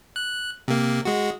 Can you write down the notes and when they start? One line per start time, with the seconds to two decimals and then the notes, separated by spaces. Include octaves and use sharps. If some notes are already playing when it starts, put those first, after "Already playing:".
0.16 F#6
0.68 C3 A#3
1.05 G#3 F#4